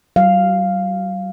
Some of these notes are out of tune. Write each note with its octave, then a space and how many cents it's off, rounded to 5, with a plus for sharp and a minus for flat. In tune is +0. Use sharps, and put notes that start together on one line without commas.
F#3 +45 F5 +0